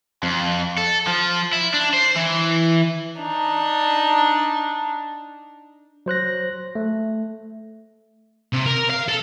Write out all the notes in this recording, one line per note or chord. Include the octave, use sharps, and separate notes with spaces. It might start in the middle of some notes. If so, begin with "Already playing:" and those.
F2
A4
F3
E4
D4
C5
E3
D4 D#4
F#3 C5 F#6 A#6
A3
C3
A#4
F5
A4